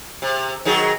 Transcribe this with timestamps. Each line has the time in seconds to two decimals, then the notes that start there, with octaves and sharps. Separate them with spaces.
0.22 C3
0.65 D#3 F#3 G#4